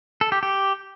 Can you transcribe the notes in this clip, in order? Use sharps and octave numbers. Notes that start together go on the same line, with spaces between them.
A4
G4
G4